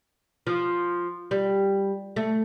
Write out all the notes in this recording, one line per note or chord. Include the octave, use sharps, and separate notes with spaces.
F3
G3
A3